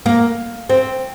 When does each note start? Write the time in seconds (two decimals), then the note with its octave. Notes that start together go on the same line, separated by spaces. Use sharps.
0.06 A#3
0.69 C4